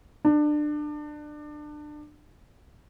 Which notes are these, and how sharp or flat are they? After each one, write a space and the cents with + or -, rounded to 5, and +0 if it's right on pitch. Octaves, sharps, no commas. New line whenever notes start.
D4 +25